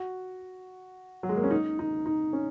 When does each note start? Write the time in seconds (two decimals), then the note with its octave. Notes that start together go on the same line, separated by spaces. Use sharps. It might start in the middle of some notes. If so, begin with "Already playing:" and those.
Already playing: F#4
1.23 F#3
1.29 G#3
1.37 A#3
1.44 C#4
1.51 D#4
1.79 D#4
2.06 D#4
2.33 C#4